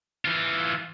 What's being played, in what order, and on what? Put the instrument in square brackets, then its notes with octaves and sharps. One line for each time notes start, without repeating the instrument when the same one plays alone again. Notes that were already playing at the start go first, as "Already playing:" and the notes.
[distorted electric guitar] E3 F4